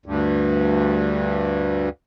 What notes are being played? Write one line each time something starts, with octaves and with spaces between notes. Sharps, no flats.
D2 G2